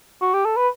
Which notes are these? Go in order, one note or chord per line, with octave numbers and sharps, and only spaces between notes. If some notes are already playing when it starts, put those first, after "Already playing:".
F#4
G4
A4
B4